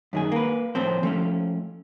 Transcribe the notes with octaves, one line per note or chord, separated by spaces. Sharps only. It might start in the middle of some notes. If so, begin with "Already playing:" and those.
F#2 D#3 G#4
A#3 B4
A2 F3 C4 C5
F3 A3 C#4